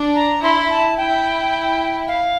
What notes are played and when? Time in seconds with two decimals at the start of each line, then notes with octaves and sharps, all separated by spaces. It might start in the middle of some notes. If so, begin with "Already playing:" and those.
Already playing: D4
0.15 A#5
0.42 E4 C6
0.70 A5
0.97 E4 G5
2.08 F5